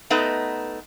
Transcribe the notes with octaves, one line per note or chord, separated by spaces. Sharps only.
A3 B3 D#4 B4 D#5